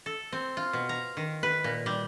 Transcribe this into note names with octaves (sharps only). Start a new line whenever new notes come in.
A4
C4
F4
B2
A#5
D#3
B4
A#2
G3